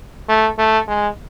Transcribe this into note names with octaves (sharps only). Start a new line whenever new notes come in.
A3
A3
G#3